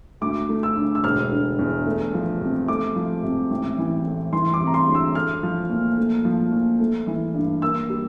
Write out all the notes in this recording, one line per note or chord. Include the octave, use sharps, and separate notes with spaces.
D2 D6
A3
E6
D3
E6
E1 F6
D3
E2
A3
F3
C3
A3 D6
F3
C3
A1
E3
A2
E3 C6
D6
C3
A#5
C6
D2
E6
A3 F6
F3
A#2
A3
F3
A#2
A3
E3
G2
A#3 E6
G3